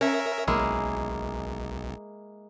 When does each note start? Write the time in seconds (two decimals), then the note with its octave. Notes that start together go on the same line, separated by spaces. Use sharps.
0.01 C#4 A#4 E5
0.47 B1 G#3 A#3 E4